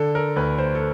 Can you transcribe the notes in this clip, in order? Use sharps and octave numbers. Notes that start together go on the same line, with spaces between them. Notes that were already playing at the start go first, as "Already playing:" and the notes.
Already playing: D3 A4
A#4
D2 B4
C5
A4